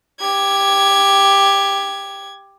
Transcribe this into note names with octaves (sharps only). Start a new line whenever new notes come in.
G4 G#6